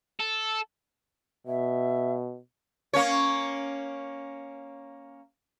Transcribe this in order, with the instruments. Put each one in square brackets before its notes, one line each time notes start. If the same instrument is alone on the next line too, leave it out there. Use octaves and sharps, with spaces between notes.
[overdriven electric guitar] A4
[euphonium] B2 [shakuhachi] E5
[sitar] A#3 C#4 C#5